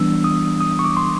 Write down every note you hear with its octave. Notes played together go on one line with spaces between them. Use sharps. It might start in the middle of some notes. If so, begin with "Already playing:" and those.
Already playing: E3 G3 B3 D4 E6
D#6
D#6
C#6
D6
C6